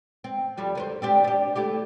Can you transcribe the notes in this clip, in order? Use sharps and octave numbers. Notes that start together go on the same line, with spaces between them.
C4
F2 G3 G4
D3 A#4 C5
C4 D4 G4
D4 G4
A3 E4 G4